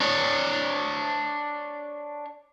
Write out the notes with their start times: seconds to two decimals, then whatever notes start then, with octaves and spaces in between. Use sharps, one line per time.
0.01 D4 C#5